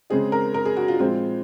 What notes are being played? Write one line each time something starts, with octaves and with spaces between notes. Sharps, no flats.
C#3 G#3 C4 G#4
A#4
A#4
G#4
F#4
F4
A#2 F3 G#3 C4 F4